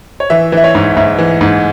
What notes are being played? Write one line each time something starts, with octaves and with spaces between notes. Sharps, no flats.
C#5
E3 E5
E3 E5
C#5
G#2
G#2 E5
E3
G#2